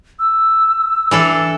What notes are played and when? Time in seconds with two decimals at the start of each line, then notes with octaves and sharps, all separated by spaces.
0.19 E6
1.11 E3 D4 A4